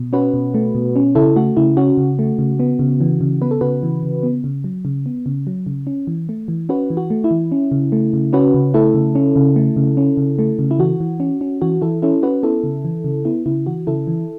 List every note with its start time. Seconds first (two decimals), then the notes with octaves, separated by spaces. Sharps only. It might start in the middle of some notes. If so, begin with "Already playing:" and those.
Already playing: B2
0.13 C#4 F#4 B4
0.34 B2
0.54 A3
0.75 B2
0.96 C#4
1.15 C#3 E4 A4
1.36 A3 F#4
1.57 C#3 E4
1.77 C#4 F#4
1.98 C#3
2.19 A3
2.39 C#3
2.60 B3
2.79 C#3
3.00 E3
3.21 C#3
3.42 B3 B4
3.51 A4
3.61 C#3 F#4 B4
3.83 E3
4.03 C#3
4.23 B3
4.44 C#3
4.64 F#3
4.85 C#3
5.06 B3
5.26 C#3
5.47 F#3
5.66 C#3
5.87 C#4
6.07 E3
6.29 A3
6.48 E3
6.69 C#4 F#4 B4
6.90 E3
6.97 F#4
7.10 A3
7.24 E4
7.31 E3
7.52 C#4
7.72 C#3
7.92 A3
8.13 C#3
8.33 C#4 F#4 B4
8.54 C#3
8.74 A3 E4 A4
8.94 C#3
9.15 C#4
9.36 C#3
9.56 A3
9.77 C#3
9.97 C#4
10.17 C#3
10.39 A3
10.59 C#3
10.71 E4
10.79 E3 F#4
11.00 E3
11.20 C#4
11.41 C#4
11.61 E3 F#4
11.82 E3 E4 A4
12.02 C#4 E4 A4
12.23 C#4 F#4 B4
12.43 B3 E4 A4
12.64 C#3
12.85 E3
13.04 C#3
13.25 B3 E4
13.46 C#3 E4
13.66 E3 F#4
13.87 C#3 E4 A4
14.07 E3